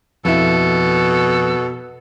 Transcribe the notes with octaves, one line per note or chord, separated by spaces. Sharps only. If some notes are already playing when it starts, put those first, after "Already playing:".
F2 B2 E4 A4